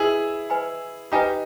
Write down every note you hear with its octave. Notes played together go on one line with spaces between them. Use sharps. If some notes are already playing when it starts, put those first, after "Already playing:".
Already playing: E4 G#4 B4 D#5 G#5 B5
B4 D#5 G#5 B5
D#4 G4 B4 D#5 G#5 B5